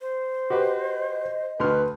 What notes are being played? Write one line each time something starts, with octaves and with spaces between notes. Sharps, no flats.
C5
F#4 G4 B4 D#5
D2 B4 C6 F6